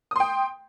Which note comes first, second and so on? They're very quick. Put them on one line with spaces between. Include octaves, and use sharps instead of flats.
D#6 C6 G5